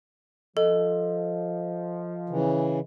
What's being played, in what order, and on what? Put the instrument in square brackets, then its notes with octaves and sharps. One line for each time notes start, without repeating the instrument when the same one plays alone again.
[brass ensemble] F3 [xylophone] A4 [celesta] D#5
[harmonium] C#3 E3